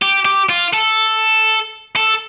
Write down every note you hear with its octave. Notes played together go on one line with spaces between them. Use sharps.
G4
G4
F4
A4
A4